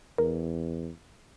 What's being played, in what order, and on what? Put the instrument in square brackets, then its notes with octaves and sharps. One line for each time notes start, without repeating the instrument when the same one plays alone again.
[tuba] E2 [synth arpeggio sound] A#4